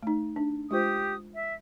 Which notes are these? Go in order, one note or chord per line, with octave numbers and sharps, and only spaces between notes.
A3 D#4
D4
G#3 F4 G4 C5 D#6
E5